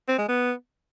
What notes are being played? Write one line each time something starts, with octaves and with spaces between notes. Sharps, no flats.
C4
G#3
B3